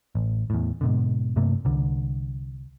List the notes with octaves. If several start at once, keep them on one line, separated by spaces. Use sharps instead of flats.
A1
E2 A2
G#2 B2 D3
G2 C3 A3 A#3
C2 D3